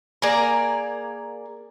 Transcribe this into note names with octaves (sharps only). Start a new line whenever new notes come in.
A#3 G#4 D5 A#5